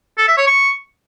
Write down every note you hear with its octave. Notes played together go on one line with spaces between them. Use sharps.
A4
E5
C#5
C#6